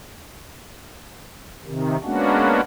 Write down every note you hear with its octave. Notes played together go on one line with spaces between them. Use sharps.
C3 D#3
G#3 A#3 B3 C#4 D4 F#4